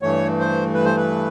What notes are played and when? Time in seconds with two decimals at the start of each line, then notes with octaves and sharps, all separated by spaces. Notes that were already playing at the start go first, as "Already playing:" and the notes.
0.02 G2 E3 A3 C#5
0.39 C5
0.74 B4
0.85 C5
0.97 B4